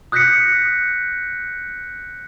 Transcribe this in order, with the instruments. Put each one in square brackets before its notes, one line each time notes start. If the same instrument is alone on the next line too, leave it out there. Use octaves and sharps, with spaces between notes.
[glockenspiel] D#6 F#6 G6 A#6 B6 C#7